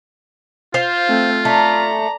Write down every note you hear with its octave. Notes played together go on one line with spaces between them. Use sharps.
F4 C5 F5
A3 C4
A3 D5 A#5